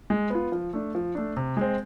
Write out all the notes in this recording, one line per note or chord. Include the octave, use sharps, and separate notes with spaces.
G#3
B3 F4
F3
A3 D4
F3
A3 D4
C3
G#3 C4